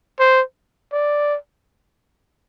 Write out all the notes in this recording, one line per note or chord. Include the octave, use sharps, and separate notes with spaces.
C5
D5